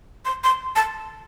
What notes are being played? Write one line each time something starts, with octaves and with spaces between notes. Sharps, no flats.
C6
C6
A5